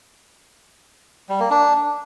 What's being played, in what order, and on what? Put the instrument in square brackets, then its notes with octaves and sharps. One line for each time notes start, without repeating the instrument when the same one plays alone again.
[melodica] G3
A#3
D4